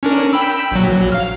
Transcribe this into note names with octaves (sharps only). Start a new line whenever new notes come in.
C#4 D4 A#4
G5 B5 E6
A#1 F#3
F5 F6